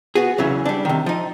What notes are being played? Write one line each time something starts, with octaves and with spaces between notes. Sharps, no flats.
B3 F#4 G#4
E2 C#3 E3 F#3
G3 D4
C3 D#3
F3 D#4